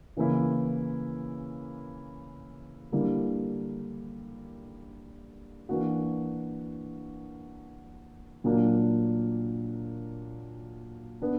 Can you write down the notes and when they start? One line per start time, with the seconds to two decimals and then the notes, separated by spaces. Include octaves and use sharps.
0.17 C#3 E3 A#3 E4
2.92 D3 G3 A#3 E4
5.69 E3 A#3 D4 F#4
8.44 A#2 F#3 A#3 D4
11.21 B3 D4